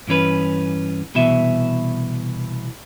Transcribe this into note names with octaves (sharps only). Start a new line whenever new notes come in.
G2 E3 C#4 B4
C2 B2 E3 E5